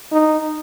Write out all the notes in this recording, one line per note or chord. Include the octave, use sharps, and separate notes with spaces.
D#4